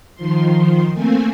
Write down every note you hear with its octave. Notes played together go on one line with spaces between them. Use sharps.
D#3 F3 C6
A3 A#3 C4 G#5